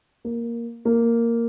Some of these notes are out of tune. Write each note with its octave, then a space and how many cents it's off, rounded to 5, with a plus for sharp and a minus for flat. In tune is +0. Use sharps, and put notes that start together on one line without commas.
A#3 +5
A#3 -5